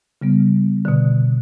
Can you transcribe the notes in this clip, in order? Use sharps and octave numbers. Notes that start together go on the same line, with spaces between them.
C#3 G3 B3
B2 D3